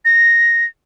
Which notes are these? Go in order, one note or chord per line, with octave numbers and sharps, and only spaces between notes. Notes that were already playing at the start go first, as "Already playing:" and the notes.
A#6